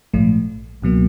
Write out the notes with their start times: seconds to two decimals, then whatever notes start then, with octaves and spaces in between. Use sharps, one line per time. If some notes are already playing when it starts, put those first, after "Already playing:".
0.14 A#1 G#2 F3 A3
0.82 C#2 B2 F#3 A#3